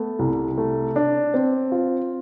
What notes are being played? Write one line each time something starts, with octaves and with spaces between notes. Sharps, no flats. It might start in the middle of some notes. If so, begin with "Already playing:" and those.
Already playing: A3 B3
C2
A3
D4
C4
F4